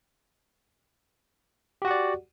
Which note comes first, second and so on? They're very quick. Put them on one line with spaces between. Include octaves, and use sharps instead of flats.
G4 F#4 F#5 D5